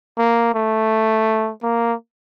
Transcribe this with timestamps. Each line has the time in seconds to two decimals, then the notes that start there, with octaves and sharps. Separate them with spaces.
0.18 A#3
0.54 A3
1.63 A#3